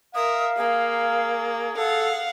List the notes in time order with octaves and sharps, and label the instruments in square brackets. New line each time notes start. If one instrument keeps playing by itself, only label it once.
[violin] A#4 E5 [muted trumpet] F5 [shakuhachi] D#6
[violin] A#3 [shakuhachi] G#4
[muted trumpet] A4 [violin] F5 F#5